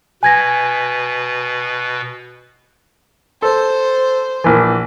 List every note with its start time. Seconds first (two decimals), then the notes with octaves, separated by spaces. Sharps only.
0.23 B2 B4 G#5 G#6 A#6
3.42 A4 C5
4.44 A#1 E3